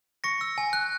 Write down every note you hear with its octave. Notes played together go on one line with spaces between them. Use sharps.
C#6 A#6 C#7
E6
G#5
F#6